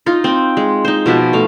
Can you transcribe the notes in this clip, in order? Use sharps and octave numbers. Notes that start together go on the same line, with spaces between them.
D#4 F4
C4 G5
G#3
D#4 C5
B2 F3 B4 A5
A3 F5